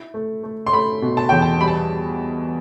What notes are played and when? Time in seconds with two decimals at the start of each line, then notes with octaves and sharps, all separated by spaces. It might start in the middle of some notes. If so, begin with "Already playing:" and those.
Already playing: E4
0.14 A3
0.44 A3
0.67 C6
0.73 A3 B5
1.02 B2
1.17 A5
1.29 E2 G5
1.42 A5
1.61 G3 B5
1.68 A5